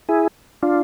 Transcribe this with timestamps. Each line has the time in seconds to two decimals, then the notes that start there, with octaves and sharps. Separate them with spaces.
0.09 E4 G#4
0.63 D4 F4